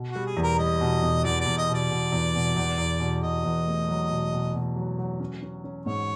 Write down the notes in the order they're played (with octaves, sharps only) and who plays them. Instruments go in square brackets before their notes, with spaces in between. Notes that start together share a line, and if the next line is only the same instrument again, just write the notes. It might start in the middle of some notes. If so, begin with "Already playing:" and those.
Already playing: [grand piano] B2
[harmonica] F#4
[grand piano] G3
[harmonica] G#4
[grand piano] E2
[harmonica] A#4
[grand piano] G3 [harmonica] D#5
[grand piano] B2
E2
[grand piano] E2 [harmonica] D5
[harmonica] D5
[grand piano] E2
[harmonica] D#5
[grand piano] B2
[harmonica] D5
[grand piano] B2
E2
B2
E2
E2
B2
[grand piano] B2 [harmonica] D#5
[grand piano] E2
A3
F#3
B2
B2
B2
F#3
F#3
C#4
C#4
C#4
[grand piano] G#2 [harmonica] C#5